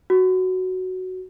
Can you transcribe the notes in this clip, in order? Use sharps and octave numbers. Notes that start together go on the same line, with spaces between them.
F#4